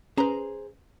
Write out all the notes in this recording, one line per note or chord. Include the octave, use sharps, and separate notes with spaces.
C#4 G#4 B4 C5 A#5